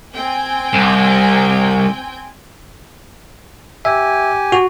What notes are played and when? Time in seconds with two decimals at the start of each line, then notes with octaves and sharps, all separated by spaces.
0.15 C4 G5 G#5
0.73 C2
3.85 G4 E5 G#5
4.52 F#4